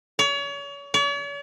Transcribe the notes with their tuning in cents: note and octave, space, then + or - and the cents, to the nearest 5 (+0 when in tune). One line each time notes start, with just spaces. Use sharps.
C#5 +35
C#5 +45